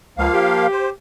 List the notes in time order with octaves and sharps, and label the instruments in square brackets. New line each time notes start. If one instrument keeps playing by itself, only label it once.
[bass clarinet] C#2 [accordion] F3 A#3 F5
[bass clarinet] G4
[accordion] C5